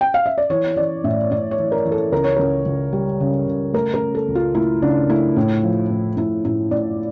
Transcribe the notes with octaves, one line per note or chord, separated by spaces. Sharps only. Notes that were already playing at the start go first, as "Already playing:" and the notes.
G5
F5
E5
D5
E3 C#5
E3 D5
A2 E5
A2 D5
C#5
E3
A#4
E3
A4
C#2 A#4
C#5
C#2 A#4
C#2
G3
C#3
C#3
A3 A#4
A#4
C#3
A4
C#2
F4
A3 E4
C#3 D4
A3 E4
A2
F3
A2
A2 E4
A2 E4
A2 D5